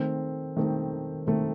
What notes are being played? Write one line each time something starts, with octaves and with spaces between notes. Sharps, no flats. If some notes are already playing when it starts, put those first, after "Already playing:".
Already playing: D#3 A3 C4
D#3 A3 C4
D#3 A3 C4